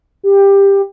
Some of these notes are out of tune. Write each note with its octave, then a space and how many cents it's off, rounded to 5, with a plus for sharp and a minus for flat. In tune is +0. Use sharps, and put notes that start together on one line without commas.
G4 +15